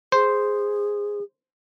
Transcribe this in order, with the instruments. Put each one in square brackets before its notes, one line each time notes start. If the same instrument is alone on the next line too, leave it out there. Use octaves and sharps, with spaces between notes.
[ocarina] G#4 [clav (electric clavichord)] C5